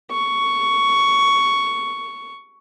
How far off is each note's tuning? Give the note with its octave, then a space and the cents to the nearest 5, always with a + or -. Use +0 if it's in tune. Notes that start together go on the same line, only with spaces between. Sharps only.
C#6 +10